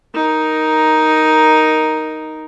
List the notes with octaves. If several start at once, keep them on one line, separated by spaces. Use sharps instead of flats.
D#4 A#4